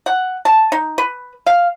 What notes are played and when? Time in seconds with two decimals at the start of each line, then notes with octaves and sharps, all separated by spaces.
0.06 F#5
0.45 A5
0.72 D#4
0.98 B4
1.46 F5